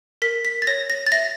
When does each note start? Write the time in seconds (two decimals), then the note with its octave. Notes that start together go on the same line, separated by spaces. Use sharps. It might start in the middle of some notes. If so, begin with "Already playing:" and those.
0.22 A#4 B6
0.45 B6
0.62 A6
0.67 C#5 A#6
0.90 A#6
1.07 A6
1.12 E5 A#6